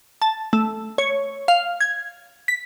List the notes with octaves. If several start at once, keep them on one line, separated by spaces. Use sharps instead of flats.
A5
A3
C#5
F5
G#6
B6